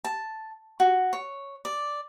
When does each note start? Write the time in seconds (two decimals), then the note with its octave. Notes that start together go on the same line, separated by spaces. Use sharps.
0.04 A5
0.80 F#4
1.13 C#5
1.65 D5